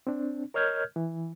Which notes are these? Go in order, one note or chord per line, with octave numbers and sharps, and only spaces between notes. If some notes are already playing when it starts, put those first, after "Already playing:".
C4 D4
A#4 C#5 D#5 F6 G6 G#6
E3